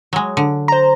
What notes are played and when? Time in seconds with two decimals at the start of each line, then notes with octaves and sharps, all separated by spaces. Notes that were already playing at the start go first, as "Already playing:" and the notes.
0.13 F#3 G#3
0.37 D3
0.68 C5 A#5